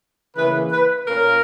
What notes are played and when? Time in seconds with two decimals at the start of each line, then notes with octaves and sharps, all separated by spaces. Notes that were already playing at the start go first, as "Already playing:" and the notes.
0.35 C#3 E3 A#3 B4
0.71 B4
1.07 A#2 A#3 C#4 A#4